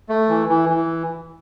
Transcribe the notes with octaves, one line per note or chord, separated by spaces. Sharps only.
A3
E3
E3
E3